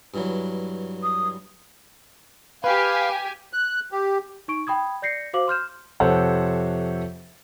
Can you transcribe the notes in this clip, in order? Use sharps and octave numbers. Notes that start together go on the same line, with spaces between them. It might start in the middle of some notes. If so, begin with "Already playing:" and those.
G2 E3 F#3
D#6
G4 B4 F5 G#5
F#6
G4
D#4 C#6 D7
G5 B5 D#6 G#6
D5 G6 A#6 C7 C#7
F#4 C5 F5 D6 F#7
C6 F6 G6 E7
F2 C3 A4 C5 C#5 F#5